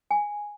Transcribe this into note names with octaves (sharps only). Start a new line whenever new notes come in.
G#5